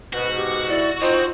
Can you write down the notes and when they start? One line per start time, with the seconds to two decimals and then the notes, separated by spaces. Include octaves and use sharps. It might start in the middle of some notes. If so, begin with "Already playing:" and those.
0.13 G#2 B2 F#4 B4
0.37 G4
0.68 E4 D5
1.01 C4 D#4 F4 C5